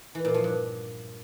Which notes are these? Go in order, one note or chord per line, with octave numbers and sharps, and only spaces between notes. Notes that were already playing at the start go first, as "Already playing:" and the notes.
E3
A#2
F3
G2